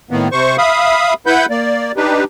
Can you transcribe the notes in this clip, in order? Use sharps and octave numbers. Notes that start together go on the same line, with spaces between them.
A2 D#3 A#3 B3
C3 C5 C#6
E5 F5 B5 D#6
E4 B4 F#5 B5 G6
A#3 D5
D4 D#4 G4 B4